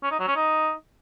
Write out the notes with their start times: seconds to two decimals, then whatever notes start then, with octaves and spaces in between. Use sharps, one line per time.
0.03 C#4
0.11 D#4
0.19 F#3
0.28 C#4
0.36 D#4